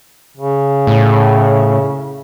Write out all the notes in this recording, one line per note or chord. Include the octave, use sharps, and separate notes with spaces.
C#3
A2